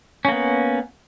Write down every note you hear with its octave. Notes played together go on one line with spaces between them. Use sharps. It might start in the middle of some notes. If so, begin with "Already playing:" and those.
A#3 B3 C#4